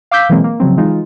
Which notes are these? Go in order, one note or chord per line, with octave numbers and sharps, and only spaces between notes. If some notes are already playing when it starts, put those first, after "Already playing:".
F5 D6 E6 G6 B6
B2 E3 F#3 G#3 A#3 C4
A#3
C#3 F3 F#3 C4
E3 G#3 D#4 F4